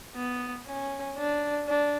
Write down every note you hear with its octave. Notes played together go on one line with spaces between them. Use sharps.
B3
C#4
D4
D4